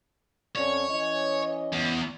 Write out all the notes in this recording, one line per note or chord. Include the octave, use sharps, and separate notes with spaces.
F2 C#4 C#5 D5
E3 C#4 D#5
E2